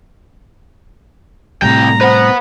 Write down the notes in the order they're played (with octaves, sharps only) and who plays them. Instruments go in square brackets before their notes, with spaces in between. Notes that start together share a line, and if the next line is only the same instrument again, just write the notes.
[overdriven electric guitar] C2 G5 [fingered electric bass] A2 C3 G3 [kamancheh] A#5
[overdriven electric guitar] B4 F#5 [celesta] C5